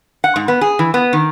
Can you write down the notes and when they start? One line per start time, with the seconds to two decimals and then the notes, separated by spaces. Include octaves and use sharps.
0.24 F#5
0.36 G#2
0.48 B3
0.61 G#4
0.79 E3
0.94 B3
1.13 D#3